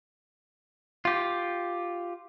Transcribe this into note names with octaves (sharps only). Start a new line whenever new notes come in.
F4 G4